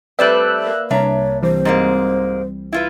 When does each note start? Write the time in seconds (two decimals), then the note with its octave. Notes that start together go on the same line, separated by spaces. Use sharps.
0.19 G3 A3 C4 B4 D5 E5 E6 F#6
0.66 A#3
0.91 C2 D4 C#5 E5 A#5
1.43 E3 G3 C4 C5
1.65 G#2 G#3 A#3
2.73 E4 F4 B4